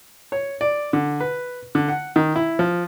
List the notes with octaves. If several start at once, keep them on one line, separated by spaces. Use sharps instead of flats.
C#5
D5
D3
B4
D3
F#5
D#3
E4
F3